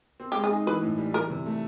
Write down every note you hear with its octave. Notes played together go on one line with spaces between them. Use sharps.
C4
G4
G#3
G#4
D#4
E3 B4
A2
G3
E3 A#4
C3
A3